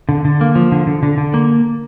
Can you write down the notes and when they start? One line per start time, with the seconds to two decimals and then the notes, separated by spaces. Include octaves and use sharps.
0.09 D3
0.25 D3
0.41 A#3
0.55 F3
0.72 D3
0.87 D3
1.03 D3
1.18 D3
1.34 A#3